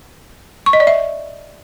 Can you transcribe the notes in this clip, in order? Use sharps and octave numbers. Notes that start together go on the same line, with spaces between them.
C#6
D#5
D5
E5